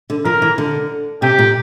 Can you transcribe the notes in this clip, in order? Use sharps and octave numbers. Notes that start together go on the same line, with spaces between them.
D3
F3 A#4
E3
D3
C3 G4
A#2